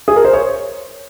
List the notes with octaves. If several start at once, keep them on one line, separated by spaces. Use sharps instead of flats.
G#4
A#4
C5
C#5